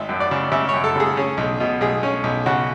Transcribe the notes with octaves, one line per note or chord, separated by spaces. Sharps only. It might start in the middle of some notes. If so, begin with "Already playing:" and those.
Already playing: G#1 E5
F#2
D5
C#3
C#3 E5
F#2 C#5
A4
C#3 G#4
C#4 G#4
B1
B2
B1 G#4
C#4
B1
C#3 F#4